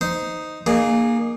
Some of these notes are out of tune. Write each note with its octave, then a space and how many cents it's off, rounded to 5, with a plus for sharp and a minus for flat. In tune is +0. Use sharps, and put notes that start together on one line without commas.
D#4 +0 C5 -15
A#3 +0 D#4 -35 G#4 -5